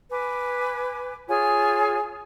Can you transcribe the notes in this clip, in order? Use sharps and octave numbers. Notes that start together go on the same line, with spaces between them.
B4 G#5 D6
F4 G#4 C#5 G#5